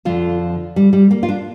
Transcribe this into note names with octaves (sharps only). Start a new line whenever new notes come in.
F2 D3 F3 F4
G3
G3
A#3
F4
D4